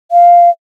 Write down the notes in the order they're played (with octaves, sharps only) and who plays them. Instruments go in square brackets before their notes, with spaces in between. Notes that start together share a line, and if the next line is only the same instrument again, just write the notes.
[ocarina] F5